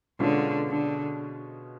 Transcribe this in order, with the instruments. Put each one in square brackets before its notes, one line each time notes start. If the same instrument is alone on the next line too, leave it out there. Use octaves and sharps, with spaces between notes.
[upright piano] B2 G#3 C#4 F4 [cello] D3
[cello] D3